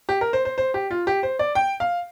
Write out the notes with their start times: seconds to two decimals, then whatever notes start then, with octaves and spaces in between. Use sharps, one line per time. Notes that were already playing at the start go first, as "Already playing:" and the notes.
0.09 G4
0.21 A#4
0.33 C5
0.45 C5
0.58 C5
0.74 G4
0.91 F4
1.07 G4
1.23 C5
1.39 D5
1.55 G5
1.80 F5